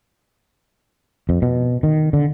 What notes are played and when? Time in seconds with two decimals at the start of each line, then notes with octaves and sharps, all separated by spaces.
1.29 F2
1.42 B2
1.83 D#3
2.13 D3